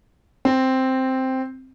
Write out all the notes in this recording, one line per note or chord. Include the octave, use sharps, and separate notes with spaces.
C4